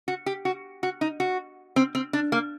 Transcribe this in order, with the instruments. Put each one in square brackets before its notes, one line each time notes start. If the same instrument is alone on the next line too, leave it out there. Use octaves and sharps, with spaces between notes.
[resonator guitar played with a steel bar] F#4
G4
F#4
F#4
D#4
F#4
C4
C4
D4
A#3